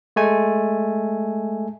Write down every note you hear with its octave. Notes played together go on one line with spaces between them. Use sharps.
G#3 A3 G#5